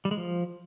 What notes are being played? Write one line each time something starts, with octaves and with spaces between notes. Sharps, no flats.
G3
G#3
F3